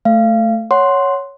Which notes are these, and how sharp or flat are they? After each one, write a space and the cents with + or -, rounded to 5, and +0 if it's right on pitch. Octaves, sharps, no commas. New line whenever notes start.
A3 +0 F5 -25
C#5 +0 F#5 +0 C6 +0